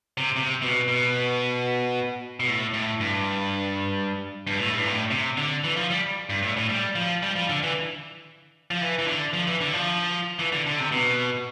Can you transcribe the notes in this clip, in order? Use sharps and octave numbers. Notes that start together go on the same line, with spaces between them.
C3
C3
B2
B2
B2
A2
A2
G2
G2
A2
G2
A2
C3
D3
E3
F3
G3
G2
A2
A2
G3
F3
G3
F3
D3
E3
F3
E3
E3
D3
F3
E3
D3
F3
E3
D3
D3
C3
B2